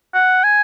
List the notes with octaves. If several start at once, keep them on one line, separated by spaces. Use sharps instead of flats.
F#5
G#5